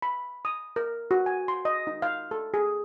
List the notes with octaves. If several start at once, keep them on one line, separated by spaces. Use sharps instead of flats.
B5
D#6
A#4
F#4
G#5
C6
D#5
D#4
F5
A4
G#4